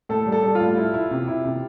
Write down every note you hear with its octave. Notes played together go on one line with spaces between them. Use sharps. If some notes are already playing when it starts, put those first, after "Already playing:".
A2 A4
G3
A4
G3
F4
A2
E4
E4
C3
E4
C3